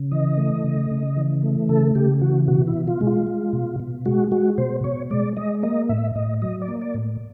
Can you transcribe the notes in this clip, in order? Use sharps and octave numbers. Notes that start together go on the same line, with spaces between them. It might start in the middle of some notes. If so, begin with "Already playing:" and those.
Already playing: C#3
E3 D#5
A3
C#3
C#3
E3
A3
C#3 A4
C#3 G4
E3 F#4
B2 F#4
E4
B2
F4
G#3
F4
G#3
B2
B2
G#3 F#4
G#3 F#4
B2 C5
B2 C#5
G#3 D5
G#3 D#5
A#3 D#5
A2 E5
A2 D#5
F#3 D#5
D5
A#3
D5
A2